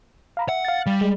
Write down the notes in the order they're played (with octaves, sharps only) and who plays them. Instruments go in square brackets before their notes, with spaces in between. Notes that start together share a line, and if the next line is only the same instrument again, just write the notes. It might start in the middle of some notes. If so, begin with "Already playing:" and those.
[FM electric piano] F5 A#5 B5
[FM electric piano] E5 [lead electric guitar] F#5
[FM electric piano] F5 A6
[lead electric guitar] G3
[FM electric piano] G#3